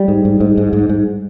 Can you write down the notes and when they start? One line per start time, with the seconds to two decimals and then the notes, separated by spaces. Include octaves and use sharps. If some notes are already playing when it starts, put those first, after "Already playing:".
Already playing: G3
0.08 G#2
0.25 G#2
0.40 G#2
0.57 G#2
0.73 G#2
0.89 G#2